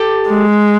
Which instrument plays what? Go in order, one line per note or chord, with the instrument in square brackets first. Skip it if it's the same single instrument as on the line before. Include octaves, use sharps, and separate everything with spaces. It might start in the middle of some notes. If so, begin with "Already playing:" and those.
Already playing: [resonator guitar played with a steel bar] G4 A4
[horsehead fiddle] G#3